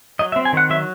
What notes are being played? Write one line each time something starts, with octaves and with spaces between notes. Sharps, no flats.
F#3 D#5
E5
C4
G#5
D#3 F#5
F#3 E5